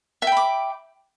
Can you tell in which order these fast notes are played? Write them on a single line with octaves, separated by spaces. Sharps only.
E5 G5 B5 D6